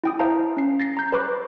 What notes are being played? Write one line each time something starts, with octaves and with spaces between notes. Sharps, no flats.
E4 G5 D#6
C5 E5 F5 A5 A#5
C#4 C7
A6 A#6 C7
A#5 G6
B4 C5 B5 C#6 D6 F#6